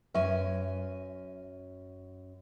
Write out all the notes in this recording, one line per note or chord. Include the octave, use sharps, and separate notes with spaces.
F#2 B4 E5 G#5 C#6